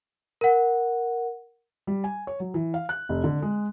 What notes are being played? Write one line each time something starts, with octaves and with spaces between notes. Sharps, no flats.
A#4 F#5
G3
G#5
C#5
F#3
E3
F5
F#6
F1
D3
G#3